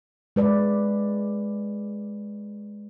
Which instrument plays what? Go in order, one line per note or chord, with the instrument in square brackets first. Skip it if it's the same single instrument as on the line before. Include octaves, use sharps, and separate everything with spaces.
[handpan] G#3 B4 D5